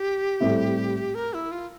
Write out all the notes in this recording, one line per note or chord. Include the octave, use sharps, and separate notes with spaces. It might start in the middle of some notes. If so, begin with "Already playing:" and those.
Already playing: G4
A2 G3 C4 E4
A#4
E4
F4